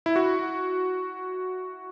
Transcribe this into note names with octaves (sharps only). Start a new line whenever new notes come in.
E4
F#4